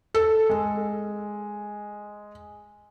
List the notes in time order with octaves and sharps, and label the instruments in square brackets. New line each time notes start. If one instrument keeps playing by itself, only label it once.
[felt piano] A4
G#3